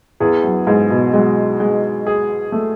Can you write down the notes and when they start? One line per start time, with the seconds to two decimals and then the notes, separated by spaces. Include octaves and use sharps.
0.20 E2 G#4
0.44 F#2
0.67 G#2 G#4
0.90 B2
1.13 F#3 G#3
1.60 G#3
2.07 G#4
2.52 A3